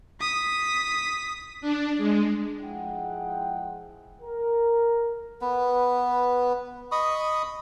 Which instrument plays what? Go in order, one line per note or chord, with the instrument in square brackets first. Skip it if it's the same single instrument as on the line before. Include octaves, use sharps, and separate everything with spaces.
[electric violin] D#6 B6
[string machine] D4
G#3
[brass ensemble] F3 G#3 E4 G#4 F#5 G5
A#4
[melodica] B3 B4
D#5 B5 C#6 D#6